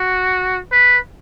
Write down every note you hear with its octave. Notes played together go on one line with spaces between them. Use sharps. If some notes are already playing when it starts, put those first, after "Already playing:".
Already playing: F#4
B4